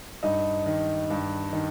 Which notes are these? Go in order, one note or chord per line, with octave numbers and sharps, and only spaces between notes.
G2 D#4
D#3
G2
D#3